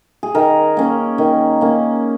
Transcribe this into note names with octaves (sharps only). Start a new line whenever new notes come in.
G#4
D#3 A#4
A#3 C#4
D#3
A#3 C#4